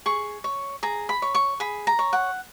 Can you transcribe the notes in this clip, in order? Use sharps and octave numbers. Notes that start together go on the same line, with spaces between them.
G#4 C#6
C#5
G#4 A#5
B5
C#5
C#6
G#4 B5
A#5
C#5
F#5